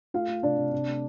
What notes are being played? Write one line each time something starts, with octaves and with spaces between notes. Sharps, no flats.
A3 F4 F5
A3
C3 D4 D5
C3
C3
A3